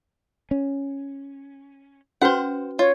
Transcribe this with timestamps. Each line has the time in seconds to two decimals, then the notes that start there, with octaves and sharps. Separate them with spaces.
0.51 C#4
2.21 C#4 F#4 B4 C5 F#5
2.79 F4 C#5